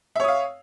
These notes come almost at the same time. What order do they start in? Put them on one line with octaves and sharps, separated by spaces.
E5 C#5 D#6 F5